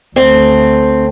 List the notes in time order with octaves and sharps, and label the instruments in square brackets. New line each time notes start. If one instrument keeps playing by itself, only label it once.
[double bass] D2 A3 [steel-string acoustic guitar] C4